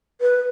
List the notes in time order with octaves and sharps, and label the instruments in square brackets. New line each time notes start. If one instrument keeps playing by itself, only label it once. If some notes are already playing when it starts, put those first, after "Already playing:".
[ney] B4